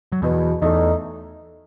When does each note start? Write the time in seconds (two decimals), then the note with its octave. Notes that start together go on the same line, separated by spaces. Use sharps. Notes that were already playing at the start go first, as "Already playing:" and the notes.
0.12 F#3
0.22 E2 B2 E3
0.62 E2 E3 A3 D#4